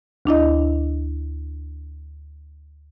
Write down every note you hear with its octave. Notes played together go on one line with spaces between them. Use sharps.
D2 D4 E4 D#5